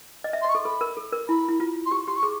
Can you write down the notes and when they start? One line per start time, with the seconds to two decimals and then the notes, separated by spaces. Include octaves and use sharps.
0.24 D#5
0.33 E5
0.42 C6
0.44 D#5
0.49 C#6
0.55 A4
0.65 A4 B5
0.81 A#4
0.97 A4
1.12 A#4
1.28 E4 B5
1.48 E4
1.60 F4
1.86 C6
1.91 G4 C#6
2.07 G4 C6
2.16 C#6
2.23 G#4